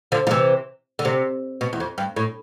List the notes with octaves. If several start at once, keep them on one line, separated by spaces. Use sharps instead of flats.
D3 F3
F3
C3 E3
D3
C3
B2
E2
F2
G2
A2